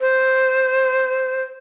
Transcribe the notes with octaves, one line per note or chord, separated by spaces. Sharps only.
C5